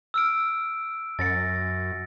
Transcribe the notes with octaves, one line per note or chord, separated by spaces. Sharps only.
E6 F6 D7
F#2 A6 A#6 C#7